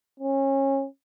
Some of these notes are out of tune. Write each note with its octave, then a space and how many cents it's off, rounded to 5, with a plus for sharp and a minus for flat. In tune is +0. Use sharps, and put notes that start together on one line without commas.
C#4 -25